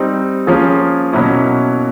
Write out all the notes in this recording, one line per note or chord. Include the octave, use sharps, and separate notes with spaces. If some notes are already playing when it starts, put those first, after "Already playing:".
Already playing: G3 C4 D#4
F3 A#3 C#4 F4 G#4
B2 F#3 A#3 C#4 E4